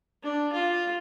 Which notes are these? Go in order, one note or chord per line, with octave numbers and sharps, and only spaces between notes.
D4
F4